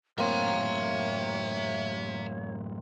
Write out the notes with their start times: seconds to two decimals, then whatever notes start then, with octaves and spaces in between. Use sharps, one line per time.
0.18 F#2 A2 A#3 C4 C#5 E5 A#5